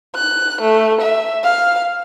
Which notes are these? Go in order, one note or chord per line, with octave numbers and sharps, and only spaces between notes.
F#6
A3
E5
F5